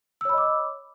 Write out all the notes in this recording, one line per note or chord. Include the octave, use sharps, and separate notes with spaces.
C#5 D#5 B5 D6 E6